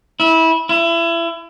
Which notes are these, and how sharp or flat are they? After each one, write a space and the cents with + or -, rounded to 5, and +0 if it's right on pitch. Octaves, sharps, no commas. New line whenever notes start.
E4 -20
E4 +30